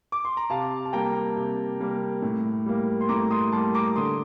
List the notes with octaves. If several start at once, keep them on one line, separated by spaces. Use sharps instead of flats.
D6
C6
A#5
C3 F5 A5
A5
G3 A#3 G5 A#5
C3
G3 A#3
A2
G3 A#3
C6
A2 A#5 D6
C6 D#6
G3 A#3 A5 C6
A#5 D6
D3 C6 D#6